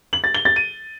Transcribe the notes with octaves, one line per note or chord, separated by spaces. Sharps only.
F#7
A6
G7
A6
D#7